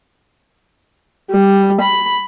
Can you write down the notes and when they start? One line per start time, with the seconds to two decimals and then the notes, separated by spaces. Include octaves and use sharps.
1.31 G3
1.82 B5